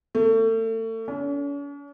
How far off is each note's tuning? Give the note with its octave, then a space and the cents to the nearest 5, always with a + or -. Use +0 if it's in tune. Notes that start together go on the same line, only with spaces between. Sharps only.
A3 +35
C#4 +45